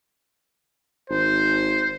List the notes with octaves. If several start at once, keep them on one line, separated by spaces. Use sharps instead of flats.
G#1 C5